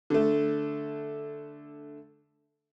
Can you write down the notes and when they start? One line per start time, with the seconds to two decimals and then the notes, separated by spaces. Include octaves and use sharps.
0.10 D3 A3